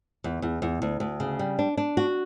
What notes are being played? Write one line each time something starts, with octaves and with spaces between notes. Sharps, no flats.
E2
E2
E2
D2
D2
C#3
G3
D4
D4
F#4